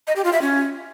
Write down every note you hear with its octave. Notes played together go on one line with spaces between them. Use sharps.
D#5
G4
F4
E5
C#4